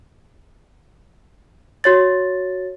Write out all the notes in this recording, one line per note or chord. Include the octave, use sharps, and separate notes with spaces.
F#4 C#5 A6